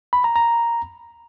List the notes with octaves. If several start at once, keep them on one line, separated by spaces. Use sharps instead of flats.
B5
A#5
A#5